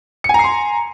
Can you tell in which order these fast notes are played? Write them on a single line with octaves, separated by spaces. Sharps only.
C#7 G#5 A#5 C7 C6